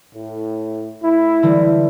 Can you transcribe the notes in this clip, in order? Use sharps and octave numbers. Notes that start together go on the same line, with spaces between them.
A2
A2 E4
D3 E3 G3